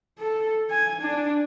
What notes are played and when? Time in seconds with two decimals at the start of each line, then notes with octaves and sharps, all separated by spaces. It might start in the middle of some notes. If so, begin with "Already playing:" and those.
0.19 A4
0.71 G#5
1.01 D4